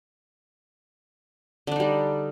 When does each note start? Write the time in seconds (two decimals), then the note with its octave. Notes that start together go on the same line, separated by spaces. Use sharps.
1.67 D3
1.72 D4
1.76 D#4
1.80 G3